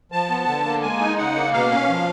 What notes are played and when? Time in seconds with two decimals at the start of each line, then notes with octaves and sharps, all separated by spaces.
0.12 F3 A5
0.30 B3
0.47 D3
0.65 A#3
0.82 G#3 G#5
1.00 D#4
1.18 C#3 F#5
1.36 A#3
1.53 B2 F5
1.72 C#4
1.89 F3